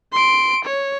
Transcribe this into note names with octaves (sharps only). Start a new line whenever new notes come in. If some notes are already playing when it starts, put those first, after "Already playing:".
C6 D7
C#5